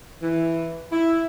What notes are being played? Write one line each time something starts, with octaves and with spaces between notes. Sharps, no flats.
E3
E4